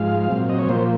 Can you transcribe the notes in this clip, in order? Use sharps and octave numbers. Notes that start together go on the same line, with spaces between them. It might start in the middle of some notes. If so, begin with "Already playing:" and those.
Already playing: G#2 F3 G#3 F5
A#2 F#3 C4
D#5
C#5
A#2 F3 A#3 C5